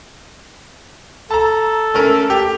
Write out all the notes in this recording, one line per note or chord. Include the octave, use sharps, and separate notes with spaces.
A4 A5 A#5
A3 C#4 A#4
G4